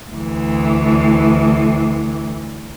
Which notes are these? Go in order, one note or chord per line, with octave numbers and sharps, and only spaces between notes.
D2 E3